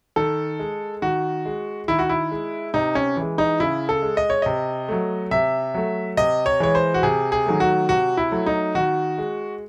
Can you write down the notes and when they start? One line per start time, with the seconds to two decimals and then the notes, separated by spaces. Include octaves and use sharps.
0.16 D#3 A4
0.59 G#3
1.02 D#3 F#4
1.45 G#3
1.88 D#3 E4
1.99 F#4
2.09 E4
2.31 G#3
2.74 C3 D#4
2.95 C#4
3.16 E3 G#3
3.38 D#4
3.60 C#3 E4
3.89 A4
4.02 G#3
4.17 D#5
4.30 C#5
4.42 C3 D#5
4.88 F#3 A3
5.31 C3 E5
5.74 F#3 A3
6.17 C3 D#5
6.46 C#5
6.60 E3 G#3 C#5
6.75 C5
6.94 F#4
7.03 C3 G#4
7.32 G#4
7.46 D#3 F#3 A3
7.60 F#4
7.89 C3 F#4
8.17 E4
8.32 F#3 A3
8.46 D#4
8.75 D#3 F#4
9.18 G#3